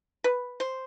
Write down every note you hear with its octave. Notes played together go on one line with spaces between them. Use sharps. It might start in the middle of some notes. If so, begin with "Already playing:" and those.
B4
C5